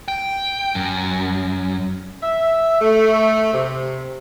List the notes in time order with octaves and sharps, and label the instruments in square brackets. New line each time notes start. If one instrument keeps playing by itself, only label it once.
[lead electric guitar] G5
F#2
[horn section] E5
A3
C3